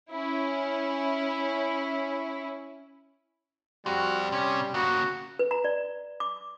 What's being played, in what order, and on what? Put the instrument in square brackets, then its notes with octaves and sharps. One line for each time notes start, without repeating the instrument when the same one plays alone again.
[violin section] C#4 E4
[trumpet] G3 [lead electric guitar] C4 F4 [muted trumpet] F#4
[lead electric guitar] C3 [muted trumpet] C#4
[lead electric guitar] C#3 A#3 [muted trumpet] F#4
[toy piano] B4
A#5
D5
D6